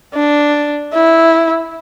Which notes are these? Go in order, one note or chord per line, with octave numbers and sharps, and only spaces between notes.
D4
E4